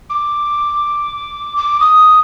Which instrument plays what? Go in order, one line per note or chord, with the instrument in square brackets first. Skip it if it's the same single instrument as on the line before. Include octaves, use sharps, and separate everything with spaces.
[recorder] D6
D6
D#6